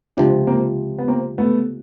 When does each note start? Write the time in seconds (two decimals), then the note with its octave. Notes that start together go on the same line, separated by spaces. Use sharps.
0.17 C#2 C3 F3 C4 D4
0.47 A#3 C4
0.98 B3
1.08 A#3 C4
1.38 A3 B3